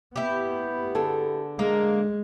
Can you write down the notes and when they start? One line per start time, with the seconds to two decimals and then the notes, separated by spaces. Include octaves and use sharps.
0.16 B3 E4 G4
0.95 D3 G#4 A4
1.59 G#3 A#3